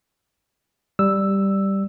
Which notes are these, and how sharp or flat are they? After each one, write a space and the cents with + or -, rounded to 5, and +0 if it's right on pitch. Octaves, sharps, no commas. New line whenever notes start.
G3 +0 E6 +0